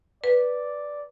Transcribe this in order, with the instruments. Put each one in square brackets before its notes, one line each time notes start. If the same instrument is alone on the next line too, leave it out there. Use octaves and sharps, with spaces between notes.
[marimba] B4 [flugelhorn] D5